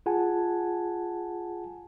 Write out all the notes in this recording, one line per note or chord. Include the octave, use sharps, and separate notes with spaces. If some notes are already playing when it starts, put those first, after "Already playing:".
F4 G#4 F#5 G#5 A5